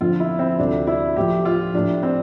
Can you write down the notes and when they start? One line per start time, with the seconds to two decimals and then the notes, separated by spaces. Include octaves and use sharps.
0.01 F2 D3 F3 F4
0.20 E4
0.39 C4
0.59 D2 C3 G3 D4
0.87 E4
1.16 A2 F3 G4
1.45 F4
1.74 A2 F3 D4
2.03 C4